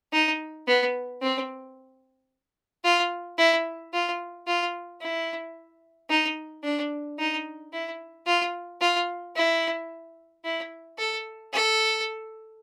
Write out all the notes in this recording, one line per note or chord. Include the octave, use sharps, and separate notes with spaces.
D#4
B3
C4
F4
E4
F4
F4
E4
D#4
D4
D#4
E4
F4
F4
E4
E4
A4
A4